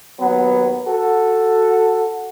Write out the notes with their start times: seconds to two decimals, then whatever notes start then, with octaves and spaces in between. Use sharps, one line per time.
0.20 D#2 F#3 B3
0.87 F#4 A4